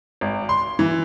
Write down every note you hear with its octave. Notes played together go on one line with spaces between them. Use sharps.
G#1
C6
E3